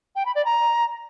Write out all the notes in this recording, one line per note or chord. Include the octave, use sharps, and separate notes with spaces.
G5
B5
D5
A#5